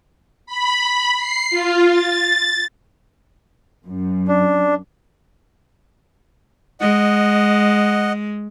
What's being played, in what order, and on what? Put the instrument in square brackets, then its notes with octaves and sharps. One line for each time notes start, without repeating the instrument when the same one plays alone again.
[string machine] B5
C7
F4
A6
[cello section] F#2
[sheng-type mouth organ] D4
[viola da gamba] G#3 [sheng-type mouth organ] D#5 F#5